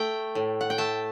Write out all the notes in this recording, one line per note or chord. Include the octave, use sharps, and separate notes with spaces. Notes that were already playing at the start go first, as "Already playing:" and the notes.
Already playing: A3 G5
A2
F#5
G5
A3 A5